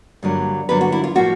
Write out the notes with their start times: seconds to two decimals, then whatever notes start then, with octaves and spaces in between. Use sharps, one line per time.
0.23 G2 D3 F#3 A#3
0.69 G2 D3 F#3 A#3 B4
0.81 F#4
0.92 E4
1.04 F4
1.15 A2 F3 A#3 F#4